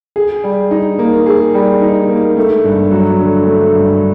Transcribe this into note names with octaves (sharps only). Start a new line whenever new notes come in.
G#4
G3
D#4
A#3
G#4
G3
D#4
A#3
A3
G2
F#3
D3
A3
G2